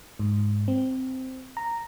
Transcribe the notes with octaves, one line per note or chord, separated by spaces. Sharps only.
G#2
C4
A#5